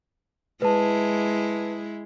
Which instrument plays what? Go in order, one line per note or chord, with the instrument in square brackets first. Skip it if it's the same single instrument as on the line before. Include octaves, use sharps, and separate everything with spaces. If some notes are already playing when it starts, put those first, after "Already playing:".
[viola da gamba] G#3 E4 [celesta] B4 A5